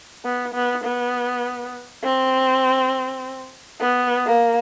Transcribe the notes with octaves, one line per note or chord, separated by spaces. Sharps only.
B3
B3
B3
C4
B3
A#3